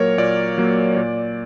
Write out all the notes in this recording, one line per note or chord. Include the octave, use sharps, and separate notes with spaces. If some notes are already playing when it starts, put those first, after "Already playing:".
Already playing: A#2 F#3 A#3 A#4 C#5
A#2 D5
F#3 A#3
A#2